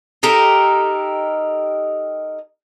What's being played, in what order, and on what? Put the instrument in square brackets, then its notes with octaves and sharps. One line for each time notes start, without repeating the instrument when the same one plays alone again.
[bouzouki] D#4 G4 A4 A#4